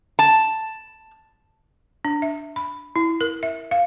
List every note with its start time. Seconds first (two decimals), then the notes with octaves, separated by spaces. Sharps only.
0.19 A5
2.05 D4
2.22 E5
2.56 B5
2.96 E4
3.21 A#4
3.43 E5
3.71 F5